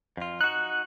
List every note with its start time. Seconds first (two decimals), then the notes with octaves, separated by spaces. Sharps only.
0.17 F2 F4
0.41 D#4 F#4 F#6